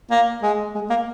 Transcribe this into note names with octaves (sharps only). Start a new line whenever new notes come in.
A#3
G#3
G#3
A#3